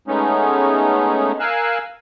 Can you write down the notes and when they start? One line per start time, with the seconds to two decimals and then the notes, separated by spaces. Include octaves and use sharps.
0.08 G#3 A3 B3 C#4 D#4
1.40 A#4 F5 G#5 E6 F#6